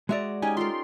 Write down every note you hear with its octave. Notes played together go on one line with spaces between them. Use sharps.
G#3 F#4 D5 E5 A#5 C#6
C#4 D#4 G4 G#5
F4 A4 A#4 C6